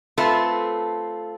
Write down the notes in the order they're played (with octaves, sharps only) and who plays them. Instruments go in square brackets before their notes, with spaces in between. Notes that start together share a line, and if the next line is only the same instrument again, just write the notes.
[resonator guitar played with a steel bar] A3 C4 F4 A4 B4